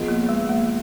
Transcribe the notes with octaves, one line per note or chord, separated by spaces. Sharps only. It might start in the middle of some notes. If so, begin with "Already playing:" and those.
Already playing: F3 B3 F4 G#4 D#5
A#3
G#3
A#3